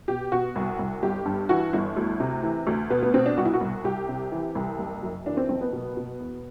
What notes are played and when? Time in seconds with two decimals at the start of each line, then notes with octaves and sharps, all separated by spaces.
0.08 B2 G4
0.32 B2 F#4
0.56 C2
0.79 C2
1.02 G1 G4
1.25 G2
1.49 E3 F#4
1.73 G1 E4
1.96 D2
2.20 C3
2.43 E3
2.67 D2
2.90 B2 B3
3.03 B3
3.14 B2 C4
3.26 D4
3.37 C2 F#4
3.45 E4
3.53 F#4
3.61 C2
3.84 C2 G4
4.09 C3
4.32 E3
4.55 C2
4.79 F#1
5.03 F#2
5.26 E3 D4
5.37 C4
5.49 F#1 C4
5.61 B3
5.73 B2
5.97 B2
6.20 E2